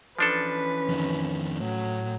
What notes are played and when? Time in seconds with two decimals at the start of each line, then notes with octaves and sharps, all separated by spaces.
0.19 E3 F3 C#4 D4 A4 B4
0.89 F2 D#3
1.61 A2 F#3